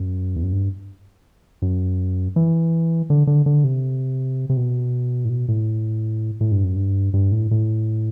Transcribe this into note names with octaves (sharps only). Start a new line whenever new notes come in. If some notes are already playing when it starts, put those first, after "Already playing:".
Already playing: F#2
E2
F#2
G2
F#2
E3
D3
D3
D3
C3
C3
B2
A2
B2
A2
A2
G2
F#2
G2
G2
A2
A2